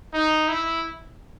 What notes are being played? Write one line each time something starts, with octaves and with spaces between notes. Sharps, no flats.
D#4
E4